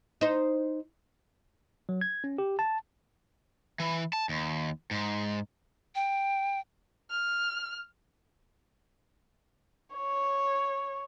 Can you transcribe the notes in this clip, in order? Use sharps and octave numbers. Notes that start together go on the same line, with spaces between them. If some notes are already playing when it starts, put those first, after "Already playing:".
D#4 C5
F#3
G#6
C#4
G4
A5
E3
A5
D#2
G#2
G5
F6
C#5